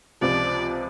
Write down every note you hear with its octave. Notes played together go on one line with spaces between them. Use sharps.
C#2 C3 F3 D5